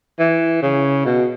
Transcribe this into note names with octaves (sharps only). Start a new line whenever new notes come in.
E3
C#3
B2